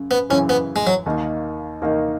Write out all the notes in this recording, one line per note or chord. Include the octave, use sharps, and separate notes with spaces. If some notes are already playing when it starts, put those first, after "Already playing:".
Already playing: F#2 C#3
B3
F#2 C#3 E3 C#4
B3
G#3
F#3
D#2 D#3 A#3 D#4
D#2 D#3 A#3 D#4